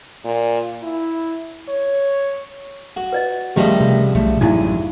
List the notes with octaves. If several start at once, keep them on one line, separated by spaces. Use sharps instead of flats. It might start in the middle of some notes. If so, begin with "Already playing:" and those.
A#2
E4
C#5
F#4
B4 D5 D#5
C#2 D#3 F3 G3 A3 G4 D#5
C3
B1 A3
A1 F#2 F#3 D#4 E4 E5 G#5